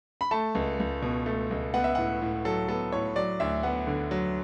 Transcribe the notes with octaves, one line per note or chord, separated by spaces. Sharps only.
B5
A3 A5
C#2
C#2
B2
A3
C#2
B3 F#5
E5
A2 F#5
A2
F#3 A4
B3 A4
A2 C#5
F#3 D5
D2 E5
B3 F#5
D3
F#3